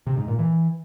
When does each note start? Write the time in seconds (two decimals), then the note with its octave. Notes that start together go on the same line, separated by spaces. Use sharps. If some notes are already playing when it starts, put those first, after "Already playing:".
0.07 C3
0.17 G#2
0.28 A#2
0.39 E3